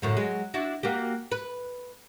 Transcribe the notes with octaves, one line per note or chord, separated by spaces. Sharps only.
F#2 A2 D3
F#3 G#3
D4 E4 F#4
A#3 F#4 G4
B4